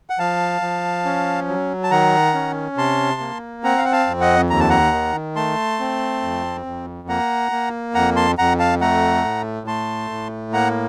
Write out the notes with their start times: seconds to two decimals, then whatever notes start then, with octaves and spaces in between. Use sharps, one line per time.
0.10 F#5
0.19 F3 F5 A5
0.62 F3
1.05 C#4
1.48 F#3
1.84 A5
1.91 D#3 F#5 A#5
2.34 C#4
2.77 C3 A5 C6
3.20 A#3
3.64 C4 F#5 A#5
3.78 F5
3.85 F#5
3.93 F5 A5
4.07 F2
4.21 D#5 F#5
4.50 D#2 A#5
4.60 A5
4.70 F#5 A#5
4.93 D#3
5.36 A3 A5 C6
5.80 C4
6.22 F2
6.66 F2
7.08 A#3 F#5 A#5
7.51 A#3
7.94 F2 F#5 A#5
8.16 A5 C6
8.38 F2 F#5 A#5
8.59 F5 A5
8.81 A3 F#5 A#5
9.24 A2
9.67 A3 A5 C6
10.11 A2
10.53 A#3 F#5 A#5